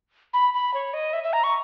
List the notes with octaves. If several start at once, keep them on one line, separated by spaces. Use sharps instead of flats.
B5
B5
C#5
D#5
E5
E5
A#5
C#6